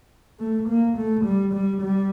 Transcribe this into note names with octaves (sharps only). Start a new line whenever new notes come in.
A3
A#3
A3
G3
G3
G3